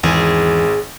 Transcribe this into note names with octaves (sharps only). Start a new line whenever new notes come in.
G#1 E2 E3 G#4